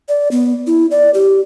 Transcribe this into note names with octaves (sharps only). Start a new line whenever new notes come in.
D5
B3
E4
D5
G4